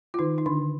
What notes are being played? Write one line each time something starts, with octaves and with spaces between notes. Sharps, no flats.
F4
D#3 D#4
D#4
D3 D4